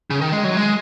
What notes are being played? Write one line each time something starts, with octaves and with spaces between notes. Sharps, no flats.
C#3
D#3
G#3
F#3
G#3